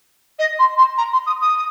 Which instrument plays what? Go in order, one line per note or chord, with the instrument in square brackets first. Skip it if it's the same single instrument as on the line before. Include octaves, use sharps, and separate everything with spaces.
[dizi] D#5
C6
C6
A#5
C6
D#6
D#6